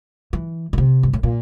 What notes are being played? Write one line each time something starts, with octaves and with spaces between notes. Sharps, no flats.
E3
A#2
C3
G2
A2
A#2